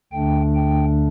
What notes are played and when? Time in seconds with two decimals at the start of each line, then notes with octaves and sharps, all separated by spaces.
0.12 D2 D3 A3 D4 G5
0.55 G5